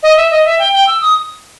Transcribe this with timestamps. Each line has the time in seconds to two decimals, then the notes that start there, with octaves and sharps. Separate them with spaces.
0.03 D#5
0.17 E5
0.31 D#5
0.45 E5
0.59 G5
0.73 G5
0.87 E6
1.01 D#6